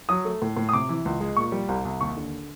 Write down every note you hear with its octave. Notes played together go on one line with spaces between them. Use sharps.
F#3 D#6
A3
A2
A2
D#6
C3 D6
E3
C#2
G#3
A#2 C#6
G3
C2
C2
D#2 C#6
D3